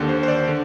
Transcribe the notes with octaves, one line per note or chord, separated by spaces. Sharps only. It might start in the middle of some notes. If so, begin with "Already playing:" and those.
Already playing: D#2 D3 G4
C5
C5
D5
D3